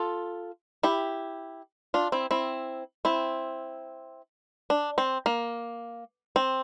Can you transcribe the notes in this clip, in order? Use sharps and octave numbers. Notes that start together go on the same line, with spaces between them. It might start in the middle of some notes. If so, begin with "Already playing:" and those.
Already playing: F4 A4
E4 G4
D4 F4
C4 E4
C4 E4
C4 E4
D4
C4
A#3
C4